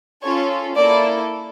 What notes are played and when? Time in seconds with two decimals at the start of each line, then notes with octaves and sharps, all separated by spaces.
0.23 C#4 F4 A4 C#5
0.76 A#3 E4 A4 D5